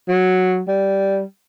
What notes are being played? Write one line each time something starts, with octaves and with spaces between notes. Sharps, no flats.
F#3
G3